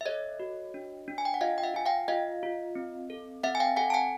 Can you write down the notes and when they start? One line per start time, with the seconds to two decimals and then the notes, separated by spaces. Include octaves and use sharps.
0.01 E5
0.06 A4 C#5 D#5
0.40 F#4
0.74 D4
1.08 D4
1.18 G#5
1.25 G5
1.34 F#5
1.41 F4 D#5 F5
1.58 G5
1.63 E5 F#5
1.74 F4 G#5
1.86 F5 G5
2.08 F4 D#5 F5
2.43 F4
2.75 C4
3.10 A4
3.43 C4 E5 F#5
3.55 G#5
3.60 F5 G5
3.77 A4 F#5 G#5
3.90 A5
3.94 F#5 G#5